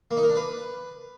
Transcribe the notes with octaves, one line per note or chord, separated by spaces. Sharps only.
A#3
D#4
A#4
D4
B4